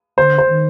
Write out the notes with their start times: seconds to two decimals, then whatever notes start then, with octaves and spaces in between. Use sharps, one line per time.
0.17 D3 C5
0.38 C5
0.49 D#3